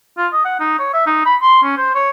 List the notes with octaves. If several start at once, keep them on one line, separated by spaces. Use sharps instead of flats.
F4
D#5
F#5
D#4
C#5
E5
D#4
B5
C6
C#4
C5
C#5